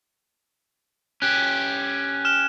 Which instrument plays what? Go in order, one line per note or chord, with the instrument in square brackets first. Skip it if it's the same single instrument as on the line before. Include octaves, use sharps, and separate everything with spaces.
[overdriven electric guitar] C#4 G4 [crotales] F#6
[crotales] F6 E7